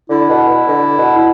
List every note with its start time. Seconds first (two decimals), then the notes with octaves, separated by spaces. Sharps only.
0.09 D3 E4
0.29 B2
0.48 B2
0.68 D3
0.98 B2
1.17 E4